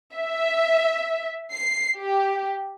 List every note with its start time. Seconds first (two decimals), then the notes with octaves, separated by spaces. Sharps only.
0.16 E5
1.52 C7
1.97 G4